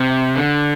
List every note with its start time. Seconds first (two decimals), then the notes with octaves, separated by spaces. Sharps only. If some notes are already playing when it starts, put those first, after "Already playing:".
Already playing: C3
0.36 D3